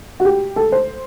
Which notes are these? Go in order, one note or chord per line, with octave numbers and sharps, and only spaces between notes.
F#4
G4
A4
C5